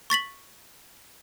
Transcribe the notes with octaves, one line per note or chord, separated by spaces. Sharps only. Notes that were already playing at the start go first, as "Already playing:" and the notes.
C#6 A6 B6 F#7